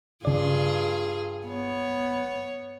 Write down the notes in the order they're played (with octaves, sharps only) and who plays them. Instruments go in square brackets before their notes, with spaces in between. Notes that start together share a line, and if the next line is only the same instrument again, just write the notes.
[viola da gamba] G2 F4 G#4 [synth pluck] C#3 D5
[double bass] B3 [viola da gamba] C#5